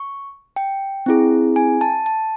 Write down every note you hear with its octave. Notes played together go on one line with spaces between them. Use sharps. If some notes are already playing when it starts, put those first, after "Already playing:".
Already playing: C#6
G5
C4 E4 G#4
G#5
A5
A5